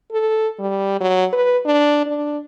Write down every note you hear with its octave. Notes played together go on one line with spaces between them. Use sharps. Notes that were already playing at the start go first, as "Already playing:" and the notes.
A4
G3
F#3
B4
D4
D4